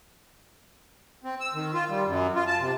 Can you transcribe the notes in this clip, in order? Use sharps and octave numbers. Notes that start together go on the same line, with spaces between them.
C4
E6
D#3
F4
G3
F#2
F4
A5
C3